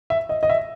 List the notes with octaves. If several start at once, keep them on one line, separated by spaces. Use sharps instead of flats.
E5
D#5
D#5
E5